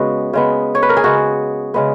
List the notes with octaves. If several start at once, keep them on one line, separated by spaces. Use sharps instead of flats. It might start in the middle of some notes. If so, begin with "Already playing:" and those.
Already playing: C#3 G#3 B3 F#4
C#3 G#3 B3
C#5
B4
A#4
G#4
C#3 G#3 B3 F#4
C#3 G#3 B3